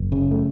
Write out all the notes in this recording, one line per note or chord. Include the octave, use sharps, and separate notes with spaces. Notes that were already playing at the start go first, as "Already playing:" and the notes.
Already playing: F#1
C#3
A3